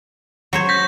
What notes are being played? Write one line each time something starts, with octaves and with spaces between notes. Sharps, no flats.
F#3 C5 C#5
G6 A#6 B6